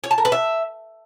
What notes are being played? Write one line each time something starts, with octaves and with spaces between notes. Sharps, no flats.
C#5
A5
A#4
B4
E5